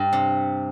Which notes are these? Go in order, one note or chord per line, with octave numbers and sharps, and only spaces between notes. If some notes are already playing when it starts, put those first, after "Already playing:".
Already playing: G2
C3